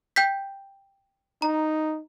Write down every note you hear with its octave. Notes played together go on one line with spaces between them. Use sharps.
G5 G6 B6
D#4 A#5